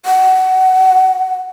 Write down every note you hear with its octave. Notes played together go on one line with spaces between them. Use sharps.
F#5